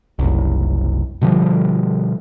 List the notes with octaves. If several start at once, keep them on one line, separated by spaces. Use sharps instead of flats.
F#1 C2
B2 D3 F3 G3